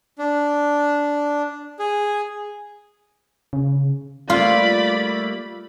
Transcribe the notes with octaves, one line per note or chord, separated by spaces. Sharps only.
D4
G#4
C#3
G3 A3 A#3 F4 D5 B5